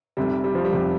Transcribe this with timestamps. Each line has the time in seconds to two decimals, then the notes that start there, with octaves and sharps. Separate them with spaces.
0.17 F1 F2 C3 G3
0.44 G3
0.55 F3
0.64 G3
0.72 F1 F2 C3